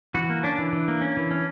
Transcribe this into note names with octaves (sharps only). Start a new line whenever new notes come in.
E3 F#4
A#3
C#4 D4
E3
E3
A#3
C#4
E3
C#4